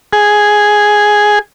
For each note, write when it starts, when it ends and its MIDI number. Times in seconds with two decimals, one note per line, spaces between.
0.13 1.39 68